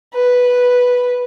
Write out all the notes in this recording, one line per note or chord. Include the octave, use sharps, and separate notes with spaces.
B4